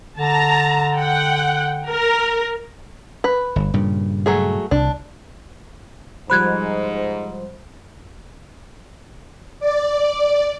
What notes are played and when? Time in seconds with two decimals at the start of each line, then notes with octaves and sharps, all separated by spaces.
0.18 D3 A5 A#5
0.96 F#5 G5
1.90 A#4
3.24 B4
3.56 G1
3.74 G2 A#2 C#3
4.26 F#3 A3 G#4
4.71 C2 D4
6.30 G#2 F3 G3 C5 B5 F#6 G#6
9.60 D5